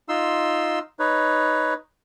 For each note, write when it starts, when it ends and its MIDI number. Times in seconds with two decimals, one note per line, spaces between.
0.09 0.79 63
0.09 0.79 65
0.09 0.79 84
0.09 0.79 88
0.99 1.74 63
0.99 1.74 71
0.99 1.74 73